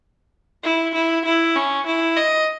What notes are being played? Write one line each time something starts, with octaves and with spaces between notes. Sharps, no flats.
E4
E4
E4
C#4
E4
D#5